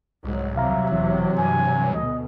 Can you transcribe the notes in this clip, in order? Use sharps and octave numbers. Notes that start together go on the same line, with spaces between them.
C2 G#2 F#3
D#2 C3 F#3 E5 F5 A#5
E1 E3
G2 G#5
D2 B2 D#5